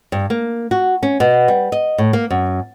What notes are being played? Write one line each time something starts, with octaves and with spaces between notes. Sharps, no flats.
G2
A#3
F#4
C#4
B2
G3
D#5
A2
A#3
F#2